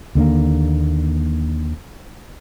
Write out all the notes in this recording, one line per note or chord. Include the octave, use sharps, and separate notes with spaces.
D#2 D3 A3 A#3